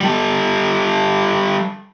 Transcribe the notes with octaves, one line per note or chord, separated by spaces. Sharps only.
G3 A4